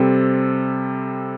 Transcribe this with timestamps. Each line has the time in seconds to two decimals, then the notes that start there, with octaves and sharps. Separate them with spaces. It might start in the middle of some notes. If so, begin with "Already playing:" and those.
Already playing: C3 G3 C4 A4